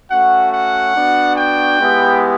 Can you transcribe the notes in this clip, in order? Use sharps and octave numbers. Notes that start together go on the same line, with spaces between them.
A3 C#4 F#4 F#5
F#5
B3 D4 F#4
G5
G#3 B3 E4 G4